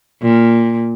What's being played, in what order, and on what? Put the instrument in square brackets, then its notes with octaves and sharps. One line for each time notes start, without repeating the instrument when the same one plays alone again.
[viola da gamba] A#2